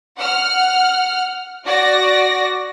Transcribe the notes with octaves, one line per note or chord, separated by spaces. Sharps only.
F#5 F6
F#4 D5 A#6